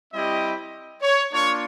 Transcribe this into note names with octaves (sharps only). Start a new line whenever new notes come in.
G3 C4 E4 G4 D#5
C#5
A#3 D4 F4 C#5